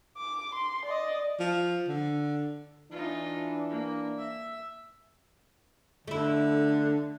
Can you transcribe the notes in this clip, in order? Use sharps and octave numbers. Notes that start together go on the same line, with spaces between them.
D6
C6
D5 D#5
F3
D3
E3 D4 D#4 F4
A#3
E5
D3 A3 E4